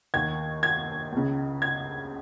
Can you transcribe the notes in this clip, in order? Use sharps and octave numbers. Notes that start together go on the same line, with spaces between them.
D#2 D#3 G#6
G#6
C#2 C#3
G#6